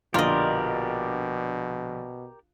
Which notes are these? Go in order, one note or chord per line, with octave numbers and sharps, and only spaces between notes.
A#1 B2 D3 F4 G4 A#4 D5 D#5